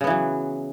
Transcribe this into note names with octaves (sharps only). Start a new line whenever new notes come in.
C#3 E3 F#3 B3